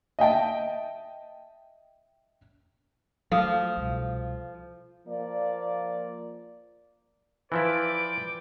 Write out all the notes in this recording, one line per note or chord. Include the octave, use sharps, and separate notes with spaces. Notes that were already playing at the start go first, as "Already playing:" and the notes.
D#5 E5 G5 A5
F3 F#3 A3 A4 F5 D#6
C2 B2
F3 A#3 D5
E3 F3 E4 B4 D5 G5 D6